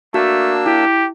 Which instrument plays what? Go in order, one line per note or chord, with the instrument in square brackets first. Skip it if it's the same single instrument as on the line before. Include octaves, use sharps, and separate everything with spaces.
[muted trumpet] A3 [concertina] A#3 D4 E6 [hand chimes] F#4
[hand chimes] E4 [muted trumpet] G4